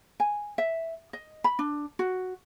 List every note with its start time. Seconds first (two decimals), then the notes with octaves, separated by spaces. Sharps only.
0.20 G#5
0.58 E5
1.13 D#5
1.44 B5
1.59 D4
1.99 F#4